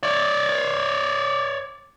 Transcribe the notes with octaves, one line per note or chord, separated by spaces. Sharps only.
C#5 D5